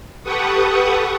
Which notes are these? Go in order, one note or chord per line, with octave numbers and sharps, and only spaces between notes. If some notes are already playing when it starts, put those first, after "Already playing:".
G4 A4 B4 F#5 C#6 D#6